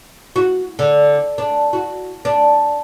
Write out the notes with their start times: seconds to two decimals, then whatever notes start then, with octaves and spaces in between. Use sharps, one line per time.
0.36 F#4
0.79 D3
1.38 D4
1.73 F#4
2.25 D4